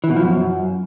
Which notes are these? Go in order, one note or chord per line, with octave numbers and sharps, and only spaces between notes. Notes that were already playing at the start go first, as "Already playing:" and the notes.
E3
B2
F3
F#2